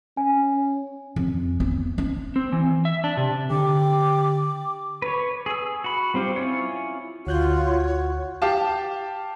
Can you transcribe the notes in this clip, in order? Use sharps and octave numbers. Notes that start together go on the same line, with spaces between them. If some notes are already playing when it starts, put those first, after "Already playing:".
C#4 G#5
F2
B3
C#4
C4
E3
E5
D4
C3
D3 G4 D6
B4 C#5
G#4 E6
F#4 B5
G3 C4 F4 G4
C#4 E4 F4 C#5
D2 F4 F#4 C#5 F#6 G6
G4 F5 A5